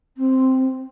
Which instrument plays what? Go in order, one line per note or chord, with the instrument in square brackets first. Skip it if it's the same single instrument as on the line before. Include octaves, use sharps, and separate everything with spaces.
[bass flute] C4